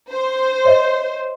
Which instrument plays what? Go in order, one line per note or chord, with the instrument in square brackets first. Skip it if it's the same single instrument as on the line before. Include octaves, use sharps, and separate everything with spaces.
[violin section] C5
[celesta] C#5 D#5 E5